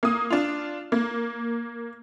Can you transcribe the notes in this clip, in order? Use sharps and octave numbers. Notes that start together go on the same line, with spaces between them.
A#3 D#6
D4 F4
A#3